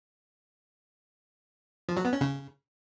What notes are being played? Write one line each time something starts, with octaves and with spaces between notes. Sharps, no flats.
F3
F#3
B3
C#4
C#3